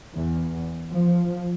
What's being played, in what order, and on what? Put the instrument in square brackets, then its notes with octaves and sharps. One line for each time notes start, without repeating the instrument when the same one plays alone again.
[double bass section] E2
F3